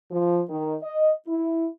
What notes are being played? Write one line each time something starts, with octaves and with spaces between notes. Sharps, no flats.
F3
D#3
D#5
E4